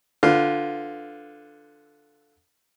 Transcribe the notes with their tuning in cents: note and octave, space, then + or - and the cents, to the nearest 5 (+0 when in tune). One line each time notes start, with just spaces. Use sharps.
D3 +0 F4 +0 B4 +20